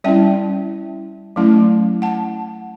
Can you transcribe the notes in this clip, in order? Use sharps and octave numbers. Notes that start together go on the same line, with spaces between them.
G3 C#4 E4 E5 G5
F#3 A3 C#4 E4
F#5 A5